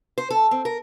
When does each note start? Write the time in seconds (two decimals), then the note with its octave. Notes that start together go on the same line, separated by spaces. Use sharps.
0.18 C5
0.30 A4
0.51 C4
0.65 A#4